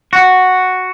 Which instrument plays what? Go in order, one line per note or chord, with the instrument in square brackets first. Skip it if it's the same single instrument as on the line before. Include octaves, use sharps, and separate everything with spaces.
[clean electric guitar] F#4